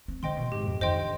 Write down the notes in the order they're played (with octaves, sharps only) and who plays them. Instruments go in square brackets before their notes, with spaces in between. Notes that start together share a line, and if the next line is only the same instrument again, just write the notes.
[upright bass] C4
[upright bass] D3 [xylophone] C5 D#5 G5 C6
[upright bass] B2
[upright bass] G#2 [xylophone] G4
[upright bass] F2
[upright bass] D#3 [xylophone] C5 D#5 G5 C6
[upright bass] D3